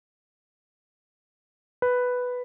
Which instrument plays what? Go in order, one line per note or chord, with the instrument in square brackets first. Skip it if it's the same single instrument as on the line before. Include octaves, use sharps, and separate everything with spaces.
[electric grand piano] B4